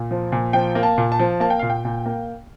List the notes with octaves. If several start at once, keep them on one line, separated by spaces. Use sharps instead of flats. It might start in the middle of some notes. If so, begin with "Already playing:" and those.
Already playing: A#2
F3
A#2
F3 G5
A#3
A5
A#2
A5
F3
A#3 A5
G5
A#2 F5
G5
A#2
A#3